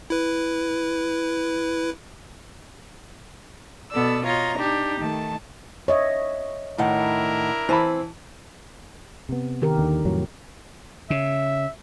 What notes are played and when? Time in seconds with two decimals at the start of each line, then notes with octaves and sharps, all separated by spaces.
0.10 E4 B4
3.92 B2 B3 A4 D5 E6
4.25 F4 C#5 D#5 A#5
4.56 D4 D#4 G4
4.98 D#3 A3 A5
5.88 C#5 D#5 E5
6.78 A2 D#3 D4 E4 A#4 F#5
7.69 E3 C4 A5 B5
9.29 C3 B3
9.62 D#3 G4 A#4
9.78 D#2 D3
10.05 F2 A2 F#3
11.10 C#3 E5